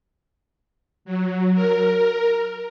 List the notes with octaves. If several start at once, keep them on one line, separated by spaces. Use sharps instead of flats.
F#3
A#4